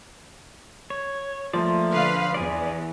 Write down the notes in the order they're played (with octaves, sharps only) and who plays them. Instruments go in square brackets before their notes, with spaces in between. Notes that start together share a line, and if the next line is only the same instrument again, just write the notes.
[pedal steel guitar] C#5
[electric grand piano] F3 [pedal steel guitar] A3 A#3 D5 [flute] C6
[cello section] D3 B4 F5
[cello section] E2 [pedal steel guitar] G#4 D5